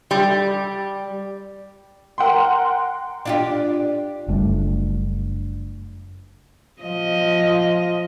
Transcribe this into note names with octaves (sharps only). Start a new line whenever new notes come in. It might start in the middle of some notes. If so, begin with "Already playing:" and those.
G3
A#4 F#5 G5 C6
D4 F4 G4
F#1 G3 A3
F3 D#5